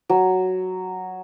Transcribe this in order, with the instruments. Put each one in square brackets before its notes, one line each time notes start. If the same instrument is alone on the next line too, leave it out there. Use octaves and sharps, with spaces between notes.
[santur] F#3